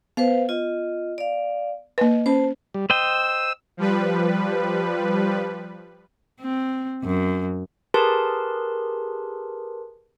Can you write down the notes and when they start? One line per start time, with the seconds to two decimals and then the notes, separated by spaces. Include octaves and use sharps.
0.17 B3 B4 C5 F5
0.49 F4 D#5
1.18 D5 F5
1.98 A#3 B4 D#5
2.26 C#4 C5 A5
2.74 G3
2.90 C5 D#5 G5 E6
3.77 F3 G3 B4
6.41 C4
7.03 F#2
7.94 G4 G#4 A#4 B4 A5 C6